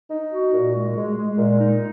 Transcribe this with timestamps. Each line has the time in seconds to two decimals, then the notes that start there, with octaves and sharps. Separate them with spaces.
0.11 D#4
0.33 F#4
0.54 A#2
0.74 G#3
0.96 G#3
1.17 G#3
1.39 A#2
1.60 D#4